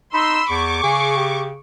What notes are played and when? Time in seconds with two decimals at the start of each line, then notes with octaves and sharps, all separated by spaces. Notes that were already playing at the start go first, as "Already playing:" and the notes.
0.14 D#4 B5 C6 E6
0.50 E2 C#6 D6
0.83 C#3 G#4
1.17 G4